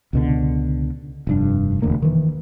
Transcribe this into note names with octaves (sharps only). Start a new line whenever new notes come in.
C#2 B2 D3
F1 G2 D4
E1 D2 A#3
D#3 E3